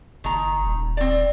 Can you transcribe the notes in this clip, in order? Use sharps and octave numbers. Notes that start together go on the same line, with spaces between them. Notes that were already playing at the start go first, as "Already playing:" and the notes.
F#1 D#3 A#5
D#1
C4 D5